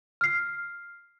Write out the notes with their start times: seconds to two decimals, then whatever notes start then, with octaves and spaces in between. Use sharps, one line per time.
0.21 F6 C7